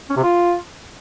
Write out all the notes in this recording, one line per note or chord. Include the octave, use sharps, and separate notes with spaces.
C#4
C3
F4